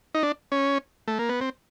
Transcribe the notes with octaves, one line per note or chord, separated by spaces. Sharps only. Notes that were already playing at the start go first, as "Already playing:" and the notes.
D#4
D4
C#4
A3
A#3
B3
C4